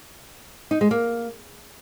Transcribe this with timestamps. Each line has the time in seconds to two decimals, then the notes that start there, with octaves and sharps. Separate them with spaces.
0.71 D#4
0.81 G#3
0.91 A#3